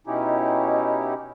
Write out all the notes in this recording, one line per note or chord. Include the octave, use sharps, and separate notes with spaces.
B2 C#4 D#4 E4 G4